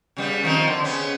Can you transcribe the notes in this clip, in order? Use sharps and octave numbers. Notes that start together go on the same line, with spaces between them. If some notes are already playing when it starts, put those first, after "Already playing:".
C#3 G3 B3
D#3 F3 C4
D3
C#3 B3 C#4